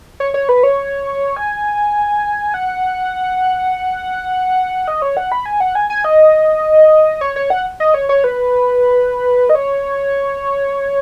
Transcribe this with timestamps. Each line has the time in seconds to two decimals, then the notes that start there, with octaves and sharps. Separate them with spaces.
0.20 C#5
0.34 C#5
0.49 B4
0.63 C#5
1.37 G#5
2.54 F#5
4.88 D#5
5.02 C#5
5.17 F#5
5.32 B5
5.46 G#5
5.60 F#5
5.75 G#5
5.90 G#5
6.05 D#5
7.21 C#5
7.36 C#5
7.50 F#5
7.80 D#5
7.94 C#5
8.09 C#5
8.24 B4
9.49 D#5
9.55 C#5